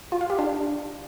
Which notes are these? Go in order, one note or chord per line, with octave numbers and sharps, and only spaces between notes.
F4
F5
G4
D4